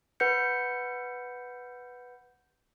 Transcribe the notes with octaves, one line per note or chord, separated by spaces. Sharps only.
B4 F#5 G6 C#7